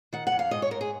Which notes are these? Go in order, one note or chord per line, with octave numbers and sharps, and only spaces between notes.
D#3 F#5
F#5
F2
F5
G#2 D#5
C#5
G#2 A#4
G#4